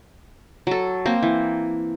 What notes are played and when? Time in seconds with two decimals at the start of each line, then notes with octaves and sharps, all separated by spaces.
0.67 F#3 A4
1.06 A#3 C4
1.23 E3